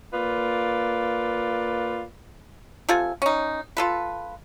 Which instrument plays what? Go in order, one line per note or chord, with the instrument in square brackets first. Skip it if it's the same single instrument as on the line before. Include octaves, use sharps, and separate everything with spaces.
[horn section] A#3 F4 B4 D5
[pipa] C3 F4 A4 G#5
C#4 D#4
F4 A4 B4